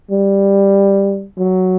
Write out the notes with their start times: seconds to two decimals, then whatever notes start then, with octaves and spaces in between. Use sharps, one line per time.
0.11 G3
1.38 F#3